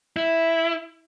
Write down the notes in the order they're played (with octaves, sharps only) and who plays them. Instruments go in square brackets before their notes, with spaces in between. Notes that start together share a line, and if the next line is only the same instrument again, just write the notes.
[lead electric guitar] E4